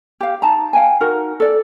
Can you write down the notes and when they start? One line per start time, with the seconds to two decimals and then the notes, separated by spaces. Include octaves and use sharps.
0.21 G4 F5
0.42 D#4 A5 A#5
0.73 F5 G5 G#5
1.00 D#4 F#4 A#4
1.40 A4 D5